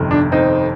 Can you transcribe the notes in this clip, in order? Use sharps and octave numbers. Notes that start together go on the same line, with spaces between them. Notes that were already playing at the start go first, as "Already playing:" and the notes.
Already playing: G1 F2 C3 D#3
D4
C4 D#4